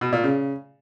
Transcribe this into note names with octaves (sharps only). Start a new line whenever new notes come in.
B2
A#2
C#3